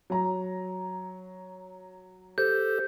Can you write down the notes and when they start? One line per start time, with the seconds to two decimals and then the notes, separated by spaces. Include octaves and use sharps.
0.10 F#3 A#5
2.38 G4 A4 C5 G6